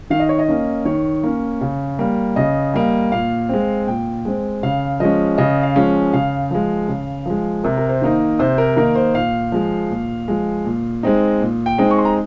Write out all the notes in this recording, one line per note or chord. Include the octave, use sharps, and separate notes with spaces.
D#3 F5
D#5
C#5
D#5
A#3 C#4
D#3 C#5
A#3 C#4
C#3
G3 A#3
C#3 D#5
G3 A#3
A#2 F5
G#3 C4
A#2 G5
G#3 C4
C#3 F5
F3 G#3 C#4 D#5
C#3 D#5
F5
F3 G#3 C#4
C#3 F5
F3 G#3
C#3
F3 G#3
C3 A#4
A#4
C5
D#3 A#3 D#4
C3 C5
A#4
D#3 A#3 D#4 A#4
C5
A#2 F5
F3 G#3
A#2
F3 G#3
A#2
G#3 C4 D#4
A#2
G5
G#3 C4 D#4
C#6
C6
A#5